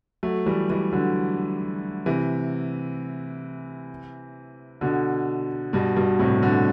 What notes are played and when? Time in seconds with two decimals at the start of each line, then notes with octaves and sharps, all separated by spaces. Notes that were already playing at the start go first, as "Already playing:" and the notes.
0.23 F#3 A3
0.46 E3 G3
0.69 E3 G3
0.93 D3 F#3
2.06 C3 E3
4.81 B2 D3
5.73 G2 B2
5.96 G2 B2
6.19 A2 C3
6.42 B2 D3